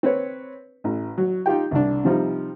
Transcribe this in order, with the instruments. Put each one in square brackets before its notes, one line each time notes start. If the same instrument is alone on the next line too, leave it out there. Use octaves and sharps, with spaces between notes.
[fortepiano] C4 B4 C#5
A1
F#3
D#4 F4 G4 G5
C2 D4
C3 F3 G3 D#4